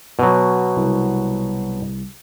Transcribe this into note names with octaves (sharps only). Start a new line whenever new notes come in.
B2 F#3
C2